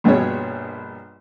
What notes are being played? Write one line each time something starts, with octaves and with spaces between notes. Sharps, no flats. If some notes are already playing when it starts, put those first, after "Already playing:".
A#1 G2 B2 G#4 C#5